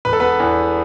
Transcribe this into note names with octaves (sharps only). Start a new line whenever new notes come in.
E1 B4
A4
B3 B4
E2